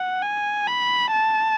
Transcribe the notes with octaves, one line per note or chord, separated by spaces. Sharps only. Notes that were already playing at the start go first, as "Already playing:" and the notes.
Already playing: F#5
G#5
B5
A5